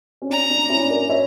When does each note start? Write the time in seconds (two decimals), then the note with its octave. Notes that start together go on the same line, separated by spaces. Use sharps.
0.22 C#4
0.30 D4 A#5
0.50 D4
0.69 C#4 E4
0.90 A#4 D5
1.09 C#5 E5